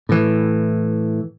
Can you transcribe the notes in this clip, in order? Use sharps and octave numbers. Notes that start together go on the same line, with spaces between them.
A2 E3